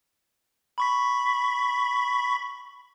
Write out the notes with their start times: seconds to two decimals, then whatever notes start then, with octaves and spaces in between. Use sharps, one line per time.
0.78 B5 C#6 B6